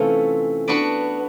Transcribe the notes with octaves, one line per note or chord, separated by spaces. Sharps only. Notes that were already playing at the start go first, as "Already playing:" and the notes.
Already playing: C3 E3 A3 C#4 F4
B3 D4 F#4 B4 D5